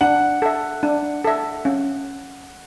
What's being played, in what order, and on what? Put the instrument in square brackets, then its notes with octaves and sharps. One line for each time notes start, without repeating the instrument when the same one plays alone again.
[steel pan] D4 [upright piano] F#5
[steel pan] A4 E5
D4
A4 E5
C#4